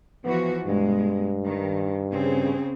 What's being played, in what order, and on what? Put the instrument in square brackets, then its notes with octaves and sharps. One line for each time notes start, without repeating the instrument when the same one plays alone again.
[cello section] E3 F3 F#4 [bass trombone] B3
[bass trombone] G2 [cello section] B2 G#3
[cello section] D#3
C#3 C4 G#4